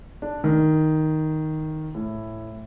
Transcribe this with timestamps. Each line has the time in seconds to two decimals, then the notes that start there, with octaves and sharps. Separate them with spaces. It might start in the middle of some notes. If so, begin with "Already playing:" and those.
0.22 D4
0.44 D#3
1.95 A2